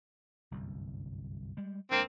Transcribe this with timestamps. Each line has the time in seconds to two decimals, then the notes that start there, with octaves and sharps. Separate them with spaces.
0.51 G1 C2 F#2
1.57 G3 G#3
1.92 D2 G#3 A#3 C4 D4